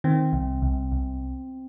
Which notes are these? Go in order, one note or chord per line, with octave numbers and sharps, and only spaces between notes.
D#3 C4
C2
C2
C2